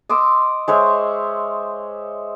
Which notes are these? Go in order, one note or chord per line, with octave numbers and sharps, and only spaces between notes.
D#5 C6 D6 E6
G#3 C5 C#5 E5